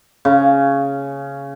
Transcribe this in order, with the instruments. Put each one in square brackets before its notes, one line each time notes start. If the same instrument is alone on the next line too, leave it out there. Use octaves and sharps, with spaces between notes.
[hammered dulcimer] C#3